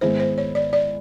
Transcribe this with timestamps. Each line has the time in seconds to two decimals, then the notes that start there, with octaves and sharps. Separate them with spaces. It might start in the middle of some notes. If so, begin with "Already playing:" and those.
0.01 G#2 D#3 G#3 B3 E4 C5
0.20 C5
0.38 C#5
0.55 D5
0.73 D5